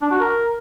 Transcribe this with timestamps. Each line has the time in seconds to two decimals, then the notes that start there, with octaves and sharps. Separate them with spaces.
0.02 D4
0.11 F#4
0.20 A#4